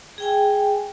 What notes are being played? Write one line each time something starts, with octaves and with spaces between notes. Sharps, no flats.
G#4 G5 G#5